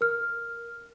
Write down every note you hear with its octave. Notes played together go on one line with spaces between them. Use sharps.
A#4 F6